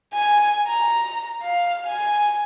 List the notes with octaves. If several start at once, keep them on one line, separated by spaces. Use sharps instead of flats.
G#5
A#5
F5
G#5